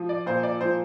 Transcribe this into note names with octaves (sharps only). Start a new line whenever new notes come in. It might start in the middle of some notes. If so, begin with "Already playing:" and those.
Already playing: F3
D5
A#2 C5
D5
F3 C5